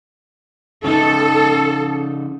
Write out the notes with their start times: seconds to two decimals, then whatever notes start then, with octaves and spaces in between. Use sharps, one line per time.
0.84 C#3 D#4 A4